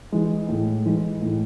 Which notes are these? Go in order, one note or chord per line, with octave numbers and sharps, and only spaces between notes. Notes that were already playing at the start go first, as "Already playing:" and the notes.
E3 G#3
A2
E3 G#3
A2